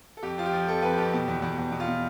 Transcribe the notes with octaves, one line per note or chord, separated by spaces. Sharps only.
A4
F2 G4
F3 F4
G4
F3
F2 A4
F2 B4
F2 G4
B2
E2
E2
E2
B2
F4
B2